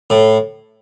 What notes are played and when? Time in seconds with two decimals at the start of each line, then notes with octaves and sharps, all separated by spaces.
0.10 A2